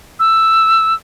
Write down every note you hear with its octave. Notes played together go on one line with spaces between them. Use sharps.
E6